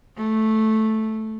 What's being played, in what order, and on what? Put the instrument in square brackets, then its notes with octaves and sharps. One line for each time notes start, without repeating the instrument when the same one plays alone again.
[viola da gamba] A3